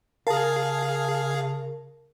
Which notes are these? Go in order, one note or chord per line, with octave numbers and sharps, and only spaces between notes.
C#3 G#4 A#4 F5 A5